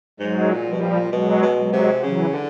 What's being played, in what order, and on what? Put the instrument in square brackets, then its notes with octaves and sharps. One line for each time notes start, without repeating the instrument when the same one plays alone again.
[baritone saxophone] G#2 [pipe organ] F#3 G#3
[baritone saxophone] A#2
[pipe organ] F3 G3
[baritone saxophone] B2
A#2
[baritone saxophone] B2 [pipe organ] F#3 G#3
[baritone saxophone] B2
[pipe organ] F#3 G#3
[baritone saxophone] C3
[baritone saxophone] C#3 [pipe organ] E3 F#3
[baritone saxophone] D3